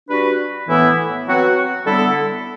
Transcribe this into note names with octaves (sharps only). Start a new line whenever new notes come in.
G3 D4 F#4 B4
A2 E3 B3 E4
F#3 C4 F#4 B4
D3 G3 B3 E4 A4